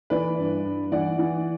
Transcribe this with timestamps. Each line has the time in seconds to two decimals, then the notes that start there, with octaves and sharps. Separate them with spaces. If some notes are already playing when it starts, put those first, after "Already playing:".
0.10 E3 B4 D5
0.38 G2
0.65 G2
0.92 E3 D5 F#5
1.19 E3